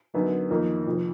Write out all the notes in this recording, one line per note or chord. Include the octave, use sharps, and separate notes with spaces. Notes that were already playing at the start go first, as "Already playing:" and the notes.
F#2 D3 F#3 B3 D#4
F2 D#3 A#3 D#4
F1 F2 F3